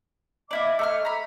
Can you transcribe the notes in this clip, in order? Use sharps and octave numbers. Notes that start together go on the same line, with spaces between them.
A#3 E4 D5 D#5 D6
A3 A#5 F6
A#5 B5